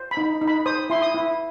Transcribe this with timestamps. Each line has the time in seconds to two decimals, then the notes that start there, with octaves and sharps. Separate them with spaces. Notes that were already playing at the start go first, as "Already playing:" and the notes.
Already playing: C5
0.11 B5
0.17 D#4
0.41 D#4
0.48 B5
0.66 C5 D#6
0.90 E4 C6
1.02 D#6
1.15 E4